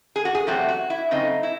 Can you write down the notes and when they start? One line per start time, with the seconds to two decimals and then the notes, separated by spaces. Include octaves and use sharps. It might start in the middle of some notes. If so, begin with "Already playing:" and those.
0.16 G#4
0.25 F#4
0.35 G#4
0.47 E2 C3 F#3 A3 C4 F#4
0.69 F#4
0.90 E4
1.11 C#3 F#3 A3 C4 D#4
1.43 E4